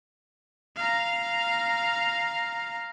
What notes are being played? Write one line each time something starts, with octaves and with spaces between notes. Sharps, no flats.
F5 A#5